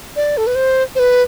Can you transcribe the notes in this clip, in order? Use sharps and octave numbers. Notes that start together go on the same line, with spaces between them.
D5
A4
B4
C5
C5
B4